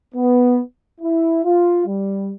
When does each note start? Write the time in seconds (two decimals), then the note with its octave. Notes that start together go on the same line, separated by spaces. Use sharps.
0.15 B3
1.01 E4
1.44 F4
1.87 G3